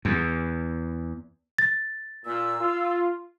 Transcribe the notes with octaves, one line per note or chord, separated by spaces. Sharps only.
E2
A6
A#2 E6
F4